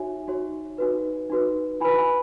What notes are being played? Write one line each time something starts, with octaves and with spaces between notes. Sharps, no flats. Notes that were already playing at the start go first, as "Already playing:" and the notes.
Already playing: D#4 F#4 C#5 E5 G#5
D#4 F#4 C#5
D#4 F#4 B4
D#4 F#4 B4
E4 B4 G#5 B5
G#5 B5